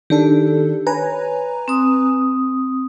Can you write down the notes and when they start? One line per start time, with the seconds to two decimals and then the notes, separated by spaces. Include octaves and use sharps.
0.10 D#3 D4 G4 A4
0.87 B4 C#5 G#5 A#5
1.68 C4 D#6